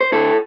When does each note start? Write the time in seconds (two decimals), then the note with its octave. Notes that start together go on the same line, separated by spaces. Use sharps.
0.01 C5
0.12 D2 D3 E4 A4